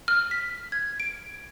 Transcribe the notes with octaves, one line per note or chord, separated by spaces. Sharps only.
F6
B6
G#6
D7